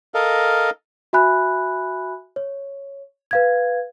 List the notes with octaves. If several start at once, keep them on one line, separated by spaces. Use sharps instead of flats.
A4 A#4 D#5 F5
F#4 E5 G#5 B5 F#6
C#5
B4 F5 G#6